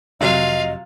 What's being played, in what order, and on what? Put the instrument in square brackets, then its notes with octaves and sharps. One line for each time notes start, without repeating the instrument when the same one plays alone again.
[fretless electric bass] F1 [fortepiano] C3 F#3 [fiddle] F4 F5 [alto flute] D#5